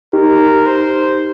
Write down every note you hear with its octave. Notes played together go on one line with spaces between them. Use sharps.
D#4 G4 A#4
C5